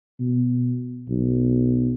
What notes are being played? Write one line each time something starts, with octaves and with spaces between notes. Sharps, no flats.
B2
B1